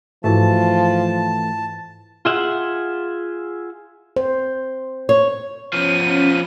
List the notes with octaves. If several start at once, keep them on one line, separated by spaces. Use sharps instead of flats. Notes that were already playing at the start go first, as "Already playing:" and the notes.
G#2 E3 F3 A3 A5
F4 G#4 E5 F#5
C5
C#5
F3 B3 C#4 D#7